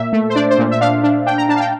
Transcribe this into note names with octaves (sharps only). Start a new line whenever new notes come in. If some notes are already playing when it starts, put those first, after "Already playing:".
Already playing: A#2 E5
A3
C5
D4 D5
C5
A#2
E5
D4 F5
D4
D4 G5
A#5
D4 A5
F5
G5